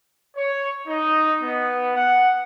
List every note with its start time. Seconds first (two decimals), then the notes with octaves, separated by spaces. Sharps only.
0.36 C#5
0.86 D#4
1.41 B3
1.96 F#5